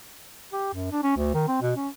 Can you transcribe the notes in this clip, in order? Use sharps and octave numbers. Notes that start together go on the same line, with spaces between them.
G4
F#2
D4
C#4
D2
D#3
C4
B2
C#4